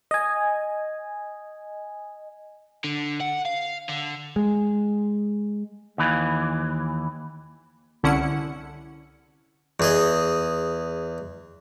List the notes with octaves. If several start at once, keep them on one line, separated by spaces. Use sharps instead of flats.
D#5 G#5
D3
F#5
F5
D3
G#3
D#2 E3
C2 D3 C#4 E4 F#5 C#7
E2 G#4 D#5